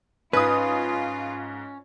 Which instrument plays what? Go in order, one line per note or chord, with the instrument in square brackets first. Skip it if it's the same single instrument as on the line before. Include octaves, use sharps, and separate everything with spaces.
[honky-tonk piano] G#2 D#6 [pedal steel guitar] C#4 [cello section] F4 [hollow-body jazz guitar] B4